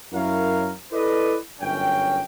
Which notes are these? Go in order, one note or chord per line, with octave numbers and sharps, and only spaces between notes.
F#2 E4 A#4 C#5 F5
E4 A4 B4 D5 D#5
G1 F#2 C#4 G5